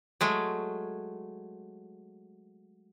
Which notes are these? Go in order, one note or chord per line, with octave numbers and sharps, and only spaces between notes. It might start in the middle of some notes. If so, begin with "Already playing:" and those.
F#3 G#3 A3